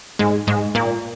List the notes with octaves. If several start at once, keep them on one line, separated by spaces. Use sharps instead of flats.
G#2 G#3
G#2 G#3
A#2 A#3